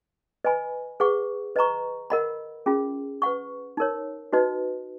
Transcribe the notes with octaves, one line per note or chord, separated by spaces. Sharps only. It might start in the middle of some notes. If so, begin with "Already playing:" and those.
B4 D#5 G#5 B5
G#4 B4 F#5 C#6
B4 D#5 A#5 C#6
A#4 D#5 F#5 B5
C#4 F4 G#4
B4 F#5 C#6
D#4 A#4 C#5
D#4 F#4 B4 D#5